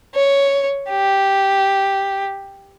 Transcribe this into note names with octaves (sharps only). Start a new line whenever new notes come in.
C#5
G4